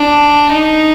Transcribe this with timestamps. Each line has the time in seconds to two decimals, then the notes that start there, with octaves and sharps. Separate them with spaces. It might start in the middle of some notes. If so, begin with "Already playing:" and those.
Already playing: D4
0.53 D#4